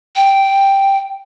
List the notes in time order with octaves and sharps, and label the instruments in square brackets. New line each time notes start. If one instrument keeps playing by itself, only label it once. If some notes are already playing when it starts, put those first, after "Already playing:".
[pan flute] G5